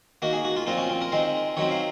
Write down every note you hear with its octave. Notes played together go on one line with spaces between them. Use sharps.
D#3 A#3 F#4
G#4
F#4
F4
A#2 F3 C4 F4
C#4
C4
A#4
D#3 G#3 C4 C5
D#3 F#3 C4 C#5
F5